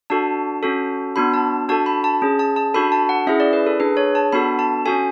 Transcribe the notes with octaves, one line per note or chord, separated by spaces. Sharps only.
D4 F#4 A4 A5
C#4 F#4 A4
B3 D4 F#4 B5
A5
D4 F#4 A4 A5
B5
A5
C#4 G#4
A5
A5
D4 F#4 A4 B5
A5
F#5
C#4 E4 G#4 E5
D5
B4
A4
D4 G#4 B4
C#5
A5
B3 D4 F#4 A4 B5
A5
C#4 F#4 A4 G#5